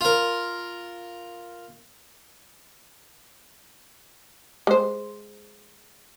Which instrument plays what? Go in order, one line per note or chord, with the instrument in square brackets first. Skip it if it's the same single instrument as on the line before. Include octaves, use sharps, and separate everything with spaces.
[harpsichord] F4 A#4
[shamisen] G#3 C5